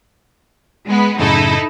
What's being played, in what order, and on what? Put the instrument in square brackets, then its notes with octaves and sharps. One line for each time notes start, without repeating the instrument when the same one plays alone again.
[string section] G#3 B3
[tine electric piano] F#2 A2 C#3 [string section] D#4 E4 A4